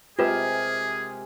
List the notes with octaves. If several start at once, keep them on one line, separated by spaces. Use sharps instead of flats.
C3 G#3 F4 G4 G#4 A#4 B4